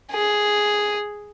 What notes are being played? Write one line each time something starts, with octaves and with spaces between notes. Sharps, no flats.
G#4